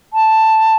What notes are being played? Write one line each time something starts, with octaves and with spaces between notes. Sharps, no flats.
A5